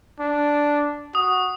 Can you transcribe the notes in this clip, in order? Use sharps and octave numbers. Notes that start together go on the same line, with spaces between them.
D4
F#4 D#6